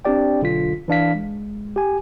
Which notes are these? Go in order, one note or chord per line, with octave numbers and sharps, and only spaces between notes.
C4 D4 G4 D5 G5
B1 D3 F4 B6
E3 D4 F5 B6
G#3
G4 G#5